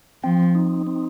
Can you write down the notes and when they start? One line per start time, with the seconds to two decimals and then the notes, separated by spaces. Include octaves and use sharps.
0.24 F3 C4
0.55 D#4
0.87 C4